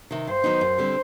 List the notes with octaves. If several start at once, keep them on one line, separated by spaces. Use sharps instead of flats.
C3 D#3
G2 C5
D#3 F#3 B3 D#4
F#2
D3 G3 C4